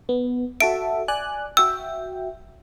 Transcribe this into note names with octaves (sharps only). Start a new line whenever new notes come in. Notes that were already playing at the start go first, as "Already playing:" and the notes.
B3
F#4 A4 E5 D7
D5 G#5 F#6
F#4 E5 G5 E6